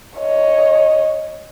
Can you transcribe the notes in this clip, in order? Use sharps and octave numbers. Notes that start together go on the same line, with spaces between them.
C#5 D#5